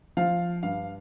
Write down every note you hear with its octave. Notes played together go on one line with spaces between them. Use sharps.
F3 F5
G2 F5